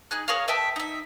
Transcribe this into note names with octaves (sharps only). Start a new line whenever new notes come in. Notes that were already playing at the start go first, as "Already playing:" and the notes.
D#4 G#4 F#6
G#4 A#4 C#5 F5
B4 E5 G5 A5
D#4 E5